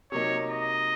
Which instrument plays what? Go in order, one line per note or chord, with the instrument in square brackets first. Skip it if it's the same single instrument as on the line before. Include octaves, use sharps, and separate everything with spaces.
[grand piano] C3 F#3 A#3 D#4 [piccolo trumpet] C#5
[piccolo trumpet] D#5